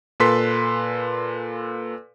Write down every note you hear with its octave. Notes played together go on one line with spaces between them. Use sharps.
A#2 A4 B4 C6 B6